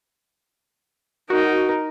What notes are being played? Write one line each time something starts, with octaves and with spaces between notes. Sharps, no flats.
D#4 F#4 A#4